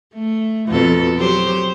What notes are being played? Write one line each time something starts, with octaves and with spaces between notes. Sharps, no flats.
A3
F2 B2 A4
F#3 G4 C5